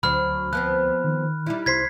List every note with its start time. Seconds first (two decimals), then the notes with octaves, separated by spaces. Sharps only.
0.03 D2 F#3 D4 C5 B5 F6
0.53 F3 B3 C4 F#6
1.04 D#3
1.46 G3 D#4 E4
1.66 C2 C5 C6 G#6 B6 C7